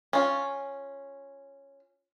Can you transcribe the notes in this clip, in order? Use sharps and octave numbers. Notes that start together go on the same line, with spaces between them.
C#4 F4